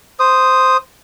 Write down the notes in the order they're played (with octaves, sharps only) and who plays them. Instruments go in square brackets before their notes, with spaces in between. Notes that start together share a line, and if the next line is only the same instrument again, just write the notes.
[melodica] C5 D#6